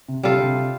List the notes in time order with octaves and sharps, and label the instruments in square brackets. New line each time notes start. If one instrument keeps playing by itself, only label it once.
[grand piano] C3
[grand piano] C3 [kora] G3 F4 A4
[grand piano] D3
C3